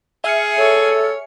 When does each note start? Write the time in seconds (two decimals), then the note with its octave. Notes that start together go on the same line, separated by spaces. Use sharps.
0.24 G#4 E5 F6 C#7
0.58 A4 C#5